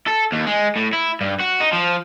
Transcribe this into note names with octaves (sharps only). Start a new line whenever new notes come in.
A4
D#2
G#3
A2
E4
G2
F#4
D#4
F3